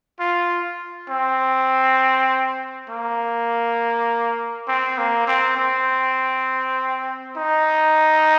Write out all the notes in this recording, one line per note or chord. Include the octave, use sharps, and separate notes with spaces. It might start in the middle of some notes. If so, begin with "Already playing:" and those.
F4
C4
A#3
C4
A#3
C4
C4
D#4